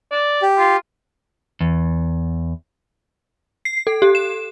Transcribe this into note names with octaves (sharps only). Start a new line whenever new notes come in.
D5
G4
F4
E2
C7
A4
G4
E7